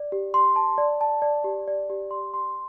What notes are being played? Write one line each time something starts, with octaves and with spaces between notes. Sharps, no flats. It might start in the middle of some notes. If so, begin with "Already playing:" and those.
Already playing: D5
G4
C6
A5
D5
A5
D5
G4
D5
G4
C6
C6